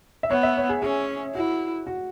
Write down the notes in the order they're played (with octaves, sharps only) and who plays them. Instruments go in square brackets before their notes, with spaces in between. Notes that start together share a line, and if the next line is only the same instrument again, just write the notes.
[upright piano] E5
[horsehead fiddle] B3 [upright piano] C#5
[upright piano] E5
C#5
G#4
[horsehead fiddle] C#4 [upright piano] G#4
[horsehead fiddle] E4 [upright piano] F#4
[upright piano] F#4